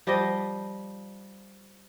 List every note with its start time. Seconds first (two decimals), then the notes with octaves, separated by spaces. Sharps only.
0.07 F3 G3 G4 D#5